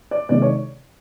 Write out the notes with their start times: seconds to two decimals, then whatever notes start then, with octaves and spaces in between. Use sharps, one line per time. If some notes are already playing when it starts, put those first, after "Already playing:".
0.11 D5
0.29 C3 D#3 G#3 D5
0.42 C#5